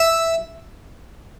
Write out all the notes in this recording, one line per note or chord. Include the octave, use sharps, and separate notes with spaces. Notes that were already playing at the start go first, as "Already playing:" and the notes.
Already playing: E5